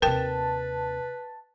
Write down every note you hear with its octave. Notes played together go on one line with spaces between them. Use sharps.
D#2 C3 A#4 B4 G5 A5